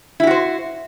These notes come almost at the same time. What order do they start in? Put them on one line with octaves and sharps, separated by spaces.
E4 G4 F#4 C5